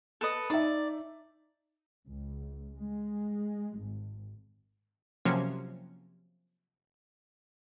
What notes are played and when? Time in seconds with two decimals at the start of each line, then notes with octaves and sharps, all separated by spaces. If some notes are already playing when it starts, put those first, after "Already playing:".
0.21 A4 B4 D#5
0.50 D#4 D5 E5
2.08 C#2
2.78 G#3
3.78 G#1
5.25 C3 F3 F#3 A#3 C#4